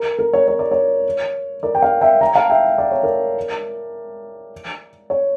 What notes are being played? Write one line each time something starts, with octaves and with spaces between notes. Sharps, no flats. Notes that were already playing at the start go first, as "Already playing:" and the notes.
Already playing: A#4
A#4
C#5
C#5
D5
C#5
A#4 D5
G5
D5 F5
E5 G5
G5 A#5
F5 A5
E5 G5
D5
C#5
A#4 D5
C#5